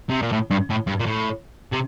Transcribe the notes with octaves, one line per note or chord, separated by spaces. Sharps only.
C3
A#2
A2
G2
A2
G2
A#2
A2
C3